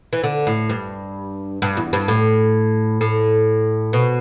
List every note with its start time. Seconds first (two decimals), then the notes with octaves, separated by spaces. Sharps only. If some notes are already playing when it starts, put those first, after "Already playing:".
0.13 E3
0.24 D3
0.47 A2
0.70 G2
1.62 G2
1.77 E2
1.93 G2
2.08 A2
3.01 A2
3.93 B2